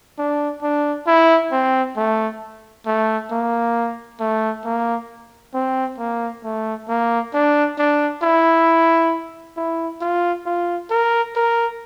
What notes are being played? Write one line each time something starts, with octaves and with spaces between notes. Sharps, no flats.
D4
D4
E4
C4
A3
A3
A#3
A3
A#3
C4
A#3
A3
A#3
D4
D4
E4
E4
F4
F4
A#4
A#4